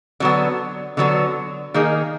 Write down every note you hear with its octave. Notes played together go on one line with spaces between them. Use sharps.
D3 F#3 B3
D3 F#3 B3
D#3 A#3 D#4 G#4